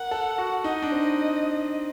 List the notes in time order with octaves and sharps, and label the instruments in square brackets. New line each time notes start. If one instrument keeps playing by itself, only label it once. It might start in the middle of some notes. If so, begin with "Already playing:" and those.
Already playing: [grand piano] A#4 [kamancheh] F#5
[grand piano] A4
F#4
[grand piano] D#4 [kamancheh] D#5
[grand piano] D4
C4